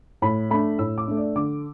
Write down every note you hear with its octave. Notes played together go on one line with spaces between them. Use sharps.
A2 B5
A3 D4 B5
A2 E6
D6
A3 D4
D5
D3 D6